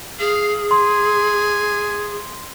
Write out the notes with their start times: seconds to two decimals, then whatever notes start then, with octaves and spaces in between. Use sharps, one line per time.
0.19 G#4 F5
0.71 G#5 C6